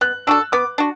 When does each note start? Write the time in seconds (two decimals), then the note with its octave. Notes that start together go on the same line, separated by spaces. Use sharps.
0.01 B3 F#6
0.27 D4 F#4 A4 E6
0.52 B3 D6
0.78 D4 F#4